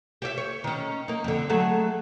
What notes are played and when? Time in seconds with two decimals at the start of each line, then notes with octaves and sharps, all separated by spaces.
0.22 G4 C#5 E5
0.38 C#5
0.64 D#3 C#4
1.08 A#3 D#4
1.24 F2 D3
1.49 F#3 A3 G#4